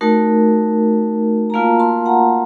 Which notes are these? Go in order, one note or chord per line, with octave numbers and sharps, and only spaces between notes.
A3 D#4 F#4 A#4
A#5
A#3 F4 F5 A5
A5 C6
F#5 A#5